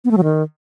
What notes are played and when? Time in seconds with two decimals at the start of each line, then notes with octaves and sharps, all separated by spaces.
0.05 B3
0.11 A3
0.17 F#3
0.24 D#3